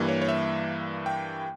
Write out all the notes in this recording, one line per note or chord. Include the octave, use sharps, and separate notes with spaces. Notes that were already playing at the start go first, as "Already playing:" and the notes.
Already playing: G2 E3 G3 A#3
C#5
C#5
E5
G5